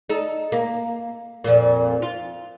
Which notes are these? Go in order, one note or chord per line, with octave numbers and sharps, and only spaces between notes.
D#4 A4
A#3
F2 A#2
F4